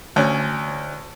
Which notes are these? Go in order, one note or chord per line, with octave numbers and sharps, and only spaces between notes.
D2 C#4